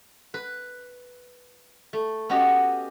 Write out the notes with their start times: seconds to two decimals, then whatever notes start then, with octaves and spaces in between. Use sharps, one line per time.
0.34 B4
1.93 A3
2.29 B3 C#4 F#4 G4 D#5 A#5